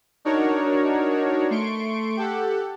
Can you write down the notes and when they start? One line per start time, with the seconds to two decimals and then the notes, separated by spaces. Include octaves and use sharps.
0.25 D4 D#4 F#4 A#4 C#5
1.50 A3 C6 C#6 D7
2.17 G4 A4 F#5